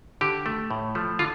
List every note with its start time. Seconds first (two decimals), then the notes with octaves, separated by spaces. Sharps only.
0.21 D3 G4
0.46 A3
0.71 A2
0.95 F3 A3
1.19 D3 F4